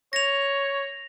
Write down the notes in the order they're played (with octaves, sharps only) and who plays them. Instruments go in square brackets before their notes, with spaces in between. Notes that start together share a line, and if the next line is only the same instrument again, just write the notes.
[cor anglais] C#5 [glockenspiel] A#6 F7